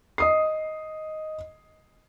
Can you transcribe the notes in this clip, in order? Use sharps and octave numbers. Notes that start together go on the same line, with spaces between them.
D#5 D#6 C7